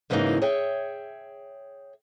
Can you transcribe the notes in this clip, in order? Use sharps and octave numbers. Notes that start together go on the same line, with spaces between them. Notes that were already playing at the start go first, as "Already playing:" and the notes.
G#2 C#3 E3 F#3 A#3 D#4
G#4 C#5 E5 G5